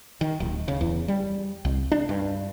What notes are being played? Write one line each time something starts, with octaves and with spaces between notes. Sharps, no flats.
D#3
D1
C#3
E2
G3
C2
D4
G2